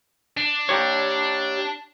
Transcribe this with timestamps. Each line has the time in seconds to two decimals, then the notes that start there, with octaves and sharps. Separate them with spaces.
0.37 D4
0.69 G4 C#5